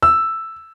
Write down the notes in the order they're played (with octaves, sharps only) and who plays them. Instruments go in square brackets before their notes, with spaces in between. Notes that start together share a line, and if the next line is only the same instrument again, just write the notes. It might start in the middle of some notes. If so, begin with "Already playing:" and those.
[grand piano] E6